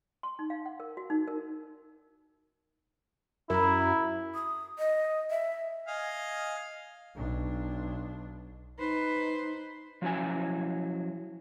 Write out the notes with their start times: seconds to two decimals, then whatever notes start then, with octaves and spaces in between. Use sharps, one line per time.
0.23 C6
0.39 D#4
0.50 F5
0.66 F#5
0.80 A#4
0.97 F#4
1.10 D#4
1.28 A#4
3.50 F#2 E4 E5 A#5 B5
4.35 D#6
4.79 D#5
5.30 E5
5.88 D#5 F5 G#5
7.16 B1 D4
8.79 D#4 B4 C5
10.02 F3 F#3 C#4 E4 G#5